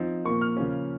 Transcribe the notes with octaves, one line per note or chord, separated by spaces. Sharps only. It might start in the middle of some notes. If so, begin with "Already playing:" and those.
Already playing: F3 C4 D#4
A#2 F3 A#3 C#6
F6
C#3 F3 A#3 C#4